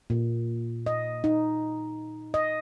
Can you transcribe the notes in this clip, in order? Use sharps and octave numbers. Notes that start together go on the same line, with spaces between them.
A#2
D#5
D#4
D#5